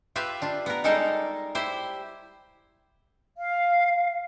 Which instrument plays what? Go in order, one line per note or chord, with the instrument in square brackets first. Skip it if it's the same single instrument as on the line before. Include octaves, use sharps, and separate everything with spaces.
[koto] F4 G4 B4 E5 F5
D4 F4
B3 A#4
G3 G#3 D#4 A4 A#4 F5
E4 G4 C5
[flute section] F5